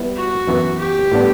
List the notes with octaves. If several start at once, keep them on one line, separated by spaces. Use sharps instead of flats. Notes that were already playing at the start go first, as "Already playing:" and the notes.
Already playing: G3 B3 E4 B4
F#4
F#2 E3 B3
G4
A2 G3 B3 D4